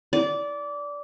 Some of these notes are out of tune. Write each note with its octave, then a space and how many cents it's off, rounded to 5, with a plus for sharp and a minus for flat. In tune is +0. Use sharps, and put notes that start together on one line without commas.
D5 -20